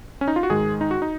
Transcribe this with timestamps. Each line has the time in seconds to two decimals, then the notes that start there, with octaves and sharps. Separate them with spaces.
0.21 C#4
0.28 D#4
0.36 F4
0.43 F#4
0.50 G#2 D#3 G#3 G#4
0.81 D#4
0.91 F#4
1.02 D#4